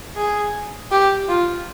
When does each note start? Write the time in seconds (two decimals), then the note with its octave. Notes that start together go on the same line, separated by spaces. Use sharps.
0.16 G#4
0.92 G4
1.29 F4